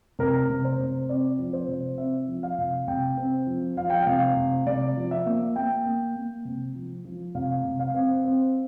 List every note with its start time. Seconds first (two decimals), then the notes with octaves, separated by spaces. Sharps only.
0.19 C3 A#4
0.50 C3
0.65 C5
0.79 C3
1.09 C4 D5
1.39 F3
1.53 C5
1.68 C3
1.98 C4 E5
2.28 F3
2.43 F5
2.58 C3
2.88 C3 G5
3.18 C4
3.47 F3
3.77 F3 F5
3.90 G5
4.03 C3 F5
4.37 C3
4.67 C3 D5
4.97 F3
5.11 E5
5.26 A#3
5.56 A#3 G5
5.85 A#3
6.15 A#3
6.45 C3
6.75 F3
7.05 F3
7.35 C3 F5
7.65 C3
7.79 F5
7.94 C4
8.25 C4